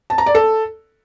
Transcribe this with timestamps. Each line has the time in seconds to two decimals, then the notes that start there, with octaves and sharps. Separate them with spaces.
0.10 A5
0.18 A#5
0.26 D5
0.35 A4